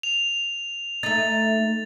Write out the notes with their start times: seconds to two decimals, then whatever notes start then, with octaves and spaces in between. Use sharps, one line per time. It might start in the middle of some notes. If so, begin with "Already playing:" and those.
0.03 F7
1.03 A3 D#4 A6